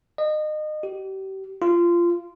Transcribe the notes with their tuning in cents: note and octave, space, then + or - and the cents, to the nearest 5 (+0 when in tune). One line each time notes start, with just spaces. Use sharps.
D#5 -30
G4 -35
F4 -20